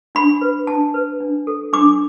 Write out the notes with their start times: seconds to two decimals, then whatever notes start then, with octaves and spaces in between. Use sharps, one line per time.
0.15 D4 B5
0.41 B4
0.67 D4 A5
0.94 B4
1.20 D4
1.47 A4
1.73 D4 D6